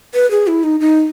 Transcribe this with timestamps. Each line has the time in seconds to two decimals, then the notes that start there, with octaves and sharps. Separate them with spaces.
0.14 B4
0.31 G#4
0.47 E4
0.63 D#4
0.80 D#4